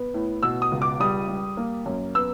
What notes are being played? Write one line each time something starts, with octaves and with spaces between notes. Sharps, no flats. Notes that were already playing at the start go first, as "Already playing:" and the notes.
Already playing: B3
A2
B2 E6
D#6
C#2
D6
G3 D#6
G3
A#3
F#2
B3 E6